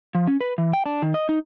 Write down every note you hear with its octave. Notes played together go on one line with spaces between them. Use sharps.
F3
C#4
B4
E3
G5
D4
D#3
D#5
D#4